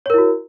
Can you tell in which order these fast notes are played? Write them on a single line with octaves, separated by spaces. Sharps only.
C#5 A#4 E4 F#4